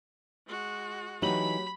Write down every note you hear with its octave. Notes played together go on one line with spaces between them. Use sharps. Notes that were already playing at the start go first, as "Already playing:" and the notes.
G#3 F#4
E3 F#3 A3 D#4 G4 B5 B6 F#7